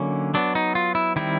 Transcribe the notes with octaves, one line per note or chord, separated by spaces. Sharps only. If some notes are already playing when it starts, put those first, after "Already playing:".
Already playing: D3 F#3 A#3 C#4 D#4
F#3 B3 D4
D#4
F4
E4
D#3 G3 C4 E4